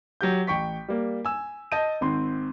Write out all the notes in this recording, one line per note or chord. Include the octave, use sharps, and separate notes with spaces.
F#3 G4 G6
A1 G5 C#6 B6
G3 A#3
G#5 E6
D#5 A5 G6 D#7
G#1 C4 C6